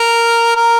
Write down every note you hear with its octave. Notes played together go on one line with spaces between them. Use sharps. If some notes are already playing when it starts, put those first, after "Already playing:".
Already playing: A#4
A#4